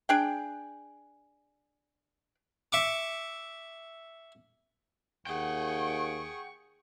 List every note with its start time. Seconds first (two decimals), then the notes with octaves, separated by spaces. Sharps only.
0.09 D4 G#4 G5
2.72 E5 C#6 D6
5.27 D#2 G#4 F#5 G5 C#6